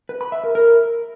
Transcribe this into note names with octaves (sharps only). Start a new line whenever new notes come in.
B4
B5
E5
A#4
A#4